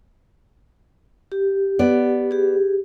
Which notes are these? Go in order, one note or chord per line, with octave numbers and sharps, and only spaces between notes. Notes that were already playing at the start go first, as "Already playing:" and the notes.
G4
B3 D5
G4 G#4